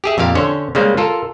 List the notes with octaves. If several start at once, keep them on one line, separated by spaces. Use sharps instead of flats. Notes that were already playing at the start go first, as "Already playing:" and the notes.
G4 G#4 E5
F2 A#2 G4 F5
D3 C#4 C5 C#5
C#3 G3 G#3 A#3 C5
F4 A4 A#4